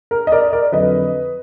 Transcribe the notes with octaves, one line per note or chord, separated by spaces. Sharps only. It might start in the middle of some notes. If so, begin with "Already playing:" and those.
A#4
D#5
A#4 D5
A#4 D5
F2 D3 F#3 B4 D#5